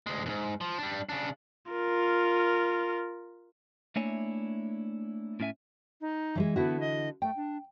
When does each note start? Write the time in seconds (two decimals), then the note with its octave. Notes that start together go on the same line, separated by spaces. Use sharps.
0.06 D2 G#3
0.26 D#2 G#2
0.61 F3
0.78 G3 D4
1.09 C#3 D4
1.72 F4 A#4
3.96 A3 A#3 D4 E4 C#5 G#5
5.40 A2 C#4 E5 G#5
6.01 D#4
6.35 E3 F3 G#3
6.56 D3 B3 E4 F#4
6.80 D#5
7.22 A3 G5
7.36 D4